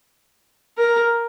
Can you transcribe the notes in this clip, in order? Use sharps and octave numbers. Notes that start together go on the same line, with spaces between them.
A#4